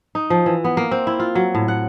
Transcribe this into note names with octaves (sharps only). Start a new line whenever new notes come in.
D#4
F3
E3
B3
A#3
C4
E4
F4
F#3
A2
F#5